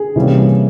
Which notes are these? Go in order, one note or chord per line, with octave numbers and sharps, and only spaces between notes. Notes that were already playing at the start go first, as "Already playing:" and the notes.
Already playing: G#4
C3 E3 G3 A#3 C#4